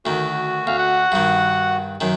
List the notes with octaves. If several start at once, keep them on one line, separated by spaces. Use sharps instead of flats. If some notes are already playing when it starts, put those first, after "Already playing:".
D2 D#3 F#4
D2 F5
F#5
G2 D#3
F#2 D#3